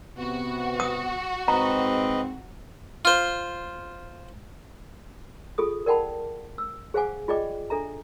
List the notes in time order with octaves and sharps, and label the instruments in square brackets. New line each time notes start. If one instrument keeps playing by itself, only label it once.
[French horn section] C3 B3 [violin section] F#4
[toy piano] D#6
[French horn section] G#2 C4 [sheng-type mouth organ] B4 D#5 [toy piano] A#5
[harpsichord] F4 C5
[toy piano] F4 G#4 A4 D#6
A#4 D5 F#5 G5 A5 B5
E6
G#4 C5 F5 F#5 G#5 D6
F4 G#4 D5 D#5 G5 D6
D4 A4 E5 A#5